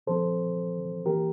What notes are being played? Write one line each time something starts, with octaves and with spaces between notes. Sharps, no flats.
A#2 F3 C4 A4 C5
E3 A#3 E4 G4 A#4